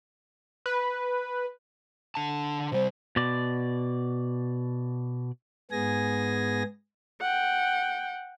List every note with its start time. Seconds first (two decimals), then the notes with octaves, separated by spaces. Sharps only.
0.66 B4
2.15 D3 A5
2.72 C3 G3 C5
3.16 B2 D5
5.71 G#2 B3 G#4 G#5 A#6
7.21 F#5 G5